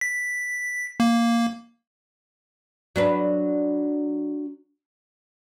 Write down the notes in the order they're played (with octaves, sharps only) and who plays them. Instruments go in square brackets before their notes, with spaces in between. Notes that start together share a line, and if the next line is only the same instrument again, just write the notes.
[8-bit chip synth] B6
A#3
[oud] F#3 D4 B4